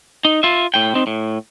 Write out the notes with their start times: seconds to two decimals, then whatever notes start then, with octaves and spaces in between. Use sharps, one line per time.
0.25 D#4
0.43 F4 E5
0.74 A2 G5
0.95 C4 D#4
1.07 A2